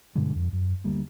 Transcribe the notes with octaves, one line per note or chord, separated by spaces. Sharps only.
G2 B2 D3 G#3
F2
F#2
D2 G3 A#3